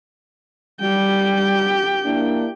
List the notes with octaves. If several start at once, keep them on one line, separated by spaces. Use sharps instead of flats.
G3 G4 G5
A#3 D4 E4